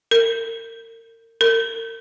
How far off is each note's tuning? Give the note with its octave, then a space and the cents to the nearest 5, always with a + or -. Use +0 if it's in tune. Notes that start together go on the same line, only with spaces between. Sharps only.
A#4 -35
A#4 -40